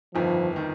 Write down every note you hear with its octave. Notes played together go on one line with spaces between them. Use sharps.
G1 F2 D#3 F3
D#3